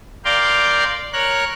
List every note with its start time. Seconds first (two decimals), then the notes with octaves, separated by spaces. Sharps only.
0.25 A#4 D5 F5 G5 C6
1.13 A#4 C#5 F#6